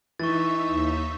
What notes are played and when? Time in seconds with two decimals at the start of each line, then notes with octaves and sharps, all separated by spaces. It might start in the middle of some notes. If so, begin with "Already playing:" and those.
0.19 E3 D#4 E5 C#6 A6
0.69 D#2